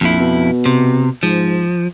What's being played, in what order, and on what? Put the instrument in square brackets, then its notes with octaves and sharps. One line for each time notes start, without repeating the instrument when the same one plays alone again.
[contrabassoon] A#1 [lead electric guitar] F2 E4
[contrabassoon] B2
[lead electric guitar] C3
[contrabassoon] G#2 [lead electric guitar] F3